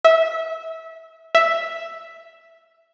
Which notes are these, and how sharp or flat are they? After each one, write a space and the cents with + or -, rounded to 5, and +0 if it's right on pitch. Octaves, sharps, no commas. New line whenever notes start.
E5 -20
E5 +0